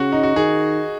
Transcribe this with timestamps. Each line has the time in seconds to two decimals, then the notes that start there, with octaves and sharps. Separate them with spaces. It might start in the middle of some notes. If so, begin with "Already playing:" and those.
Already playing: C#3 F#4
0.12 D#4
0.23 F#4
0.36 D#3 G#4